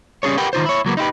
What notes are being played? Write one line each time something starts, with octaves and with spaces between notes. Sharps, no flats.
G3 C#4 G#4 A4 C#5
G4 A#4 B4 F#5 G5
D#3 D#4 F4 C5
E4 C#5
C#2 F#3 A#3 B3
D#4 E4 G4 B4